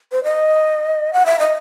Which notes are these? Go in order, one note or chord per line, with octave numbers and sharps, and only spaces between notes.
C5
D#5
F#5
E5
D#5